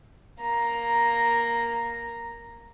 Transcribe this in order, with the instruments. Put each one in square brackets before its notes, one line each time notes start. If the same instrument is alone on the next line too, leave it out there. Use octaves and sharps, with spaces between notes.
[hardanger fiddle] A#3 A#5